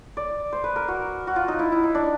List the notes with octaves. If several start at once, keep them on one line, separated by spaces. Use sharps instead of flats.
D5
C5
B4
A#4
F#4
F#4
F4
D#4
E4
E4
D#4
D4